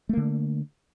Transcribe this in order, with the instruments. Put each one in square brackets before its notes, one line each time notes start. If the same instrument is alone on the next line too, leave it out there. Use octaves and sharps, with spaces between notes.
[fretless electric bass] A3
A#3
D3